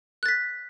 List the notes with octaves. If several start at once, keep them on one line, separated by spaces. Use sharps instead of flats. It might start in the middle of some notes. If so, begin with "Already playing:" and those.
F#6 A6 B6